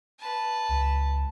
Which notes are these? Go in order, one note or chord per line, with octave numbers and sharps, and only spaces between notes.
B4 A5
C#2